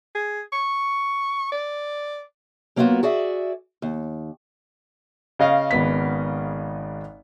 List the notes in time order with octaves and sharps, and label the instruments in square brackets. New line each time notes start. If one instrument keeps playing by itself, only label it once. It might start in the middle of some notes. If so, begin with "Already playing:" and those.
[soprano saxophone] G#4
C#6
D5
[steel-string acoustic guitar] F#3 A#3 B3 D4 F4 F#4
F#4 G#4 D5 E5
D#2
[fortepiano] C#3 D#5 F5
[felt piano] G#1 B3 B6